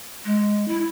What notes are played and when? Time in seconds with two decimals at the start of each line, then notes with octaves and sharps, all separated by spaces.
0.25 G#3
0.68 E4